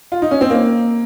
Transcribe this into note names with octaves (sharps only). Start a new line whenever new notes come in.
F4
D#4
C#4
C4
A#3